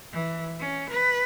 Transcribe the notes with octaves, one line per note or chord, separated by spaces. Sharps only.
E3
C#4
B4